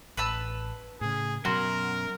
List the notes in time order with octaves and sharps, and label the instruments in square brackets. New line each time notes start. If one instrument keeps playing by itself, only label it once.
[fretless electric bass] A1 [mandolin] B4 A5 E6
[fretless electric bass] A2 C#3 [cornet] G#4
[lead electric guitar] F#2 C6 [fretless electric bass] B2 F#3 [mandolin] F#4 [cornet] A#4